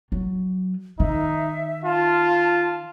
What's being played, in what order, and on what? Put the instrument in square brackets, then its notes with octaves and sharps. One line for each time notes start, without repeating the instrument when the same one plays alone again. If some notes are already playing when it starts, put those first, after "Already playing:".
[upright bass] F#3
[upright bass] D#3 [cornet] D#4 [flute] E5
[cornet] F4 [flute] A5